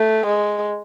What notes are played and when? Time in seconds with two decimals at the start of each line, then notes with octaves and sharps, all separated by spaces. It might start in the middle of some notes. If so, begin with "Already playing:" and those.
Already playing: A3
0.26 G#3